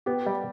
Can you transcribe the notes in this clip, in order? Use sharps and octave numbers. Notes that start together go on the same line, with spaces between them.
B3 G4
G3